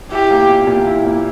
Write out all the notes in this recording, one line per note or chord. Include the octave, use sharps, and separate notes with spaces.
E4 G4
A#3
A#2
A#2
E4
A#3